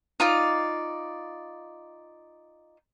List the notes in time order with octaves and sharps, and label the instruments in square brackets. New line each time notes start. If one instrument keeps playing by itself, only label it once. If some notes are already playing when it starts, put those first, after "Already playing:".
[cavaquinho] D#4 F4 D5